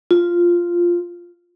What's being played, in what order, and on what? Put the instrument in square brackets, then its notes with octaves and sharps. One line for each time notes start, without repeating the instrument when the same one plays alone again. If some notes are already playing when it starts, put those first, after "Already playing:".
[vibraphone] F4